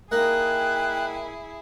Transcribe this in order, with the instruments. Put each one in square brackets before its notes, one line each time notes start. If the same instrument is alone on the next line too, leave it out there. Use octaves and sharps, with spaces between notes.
[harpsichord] A#3 D#4 [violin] E4 G#4 [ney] G5 [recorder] F#6